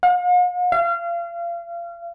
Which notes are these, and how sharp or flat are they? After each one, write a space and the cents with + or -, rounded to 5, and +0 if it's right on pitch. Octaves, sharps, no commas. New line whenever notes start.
F5 +45
F5 -35